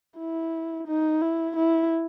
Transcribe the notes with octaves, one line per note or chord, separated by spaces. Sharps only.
E4
D#4
E4
E4